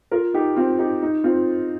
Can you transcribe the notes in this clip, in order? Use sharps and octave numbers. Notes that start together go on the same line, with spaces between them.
F4 A#4
D#4 G4
C4 F4
D#4 G4
D#4
C4 F4